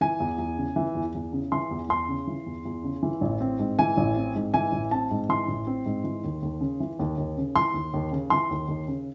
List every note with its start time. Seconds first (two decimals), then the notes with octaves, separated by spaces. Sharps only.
0.01 E3 G#5
0.20 E2
0.39 E2
0.58 C#3
0.76 E3
0.95 E2
1.15 E2
1.33 C#3
1.52 E3 C6
1.71 E2
1.89 E2 C6
2.09 C#3
2.27 E3
2.46 E2
2.65 E2
2.84 C#3
3.03 E3
3.21 A1
3.41 C4
3.59 G#2
3.79 E3 G#5
3.97 A1
4.16 C4
4.35 G#2
4.54 E3 G#5
4.72 A1
4.91 C4 A5
5.11 G#2
5.29 E3 C6
5.48 A1
5.67 C4
5.86 G#2
6.04 E3
6.24 D#2
6.42 D#2
6.61 C#3
6.80 E3
6.99 D#2
7.18 D#2
7.37 C#3
7.55 E3 C6
7.74 D#2
7.94 D#2
8.12 C#3
8.30 E3 C6
8.50 D#2
8.68 D#2
8.88 C#3